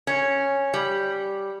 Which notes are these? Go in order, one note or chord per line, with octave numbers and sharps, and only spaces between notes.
C#4
G3